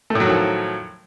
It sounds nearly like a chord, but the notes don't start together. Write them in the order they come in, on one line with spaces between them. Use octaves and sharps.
A3 A2 F#3 D#3 F3